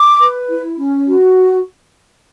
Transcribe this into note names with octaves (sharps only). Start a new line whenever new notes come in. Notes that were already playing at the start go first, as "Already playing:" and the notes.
Already playing: D6
B4
E4
C#4
F#4